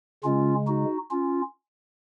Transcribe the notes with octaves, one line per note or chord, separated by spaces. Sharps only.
C#3 G#3 C#4 F4
D#4 F#4
C#4 F4